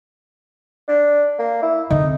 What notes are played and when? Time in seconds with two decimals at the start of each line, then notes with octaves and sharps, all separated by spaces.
0.88 D4
1.39 A#3
1.62 E4
1.90 D3 C4 D#4